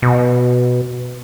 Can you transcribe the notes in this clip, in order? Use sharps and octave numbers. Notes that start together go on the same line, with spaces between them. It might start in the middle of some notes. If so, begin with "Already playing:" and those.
B2